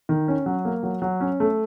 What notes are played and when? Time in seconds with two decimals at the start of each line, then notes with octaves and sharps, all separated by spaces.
0.09 D#3
0.28 C#4
0.46 F#3
0.65 A#3
0.83 F#3
1.02 F#3
1.21 C#4
1.40 A3